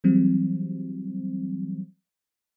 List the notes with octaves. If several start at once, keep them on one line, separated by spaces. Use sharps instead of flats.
E3 F#3 G3 C4